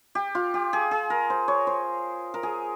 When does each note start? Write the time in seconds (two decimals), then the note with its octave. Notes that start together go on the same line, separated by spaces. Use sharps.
0.15 G4
0.35 F4
0.54 G4
0.73 G#4
0.91 G#4
1.10 A#4
1.30 C5
1.48 C#5
1.67 C5
2.34 A#4
2.43 G#4